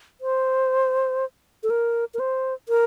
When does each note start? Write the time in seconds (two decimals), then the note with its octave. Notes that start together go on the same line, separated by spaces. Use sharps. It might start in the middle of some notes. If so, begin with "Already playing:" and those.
0.21 C5
1.63 A4
1.70 A#4
2.14 A#4
2.19 C5
2.69 A#4